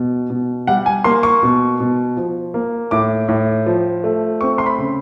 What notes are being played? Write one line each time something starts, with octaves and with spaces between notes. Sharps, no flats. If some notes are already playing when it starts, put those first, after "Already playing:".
Already playing: B2
B2
G3 F#5
G#5
A#3 C6
C#6
B2
B2
F3
A#3
A2 D6
A2
F3
A3
C4 C#6
C6
B5
C#3